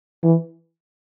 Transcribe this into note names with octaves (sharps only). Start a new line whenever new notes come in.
E3